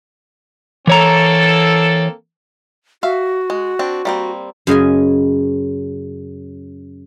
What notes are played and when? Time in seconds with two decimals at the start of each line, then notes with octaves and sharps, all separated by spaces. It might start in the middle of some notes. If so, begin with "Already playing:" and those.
0.87 E3 A#3 C4 A4 C#5 A#5
3.03 F#4 E5 F5
3.50 G#3
3.79 C4 D4
4.05 G3 A#3 C4
4.67 F#2 C#3 D#5 G#5